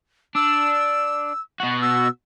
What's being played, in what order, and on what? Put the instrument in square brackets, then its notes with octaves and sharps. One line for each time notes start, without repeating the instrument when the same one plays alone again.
[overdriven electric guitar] D4 [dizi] E6
[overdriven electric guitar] B2 F#4
[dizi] E6